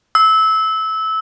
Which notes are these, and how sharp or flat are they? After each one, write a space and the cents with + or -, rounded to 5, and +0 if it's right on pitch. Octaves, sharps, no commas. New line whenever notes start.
E6 -20